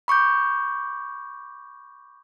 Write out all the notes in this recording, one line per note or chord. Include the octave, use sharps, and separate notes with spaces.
B5 C#6 D6 G6